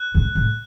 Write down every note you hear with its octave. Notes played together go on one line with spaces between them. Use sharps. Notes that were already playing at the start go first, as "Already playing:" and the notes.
Already playing: F#6
A2
A2